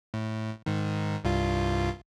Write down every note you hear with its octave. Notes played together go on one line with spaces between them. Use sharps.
A2
G#2 D#3
C2 G2 F4